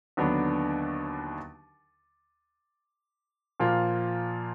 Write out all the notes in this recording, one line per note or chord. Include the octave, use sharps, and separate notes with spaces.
D#2 D3 F#3 B3 D4
A#2 F3 A#3 F4